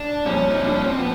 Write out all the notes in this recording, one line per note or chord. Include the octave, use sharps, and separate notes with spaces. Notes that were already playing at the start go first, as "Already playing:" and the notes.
Already playing: D4
C2 A#2 F3 C#4
D#4
C2 A#2 F3 D4
C#4
C4
A#2 F3 B3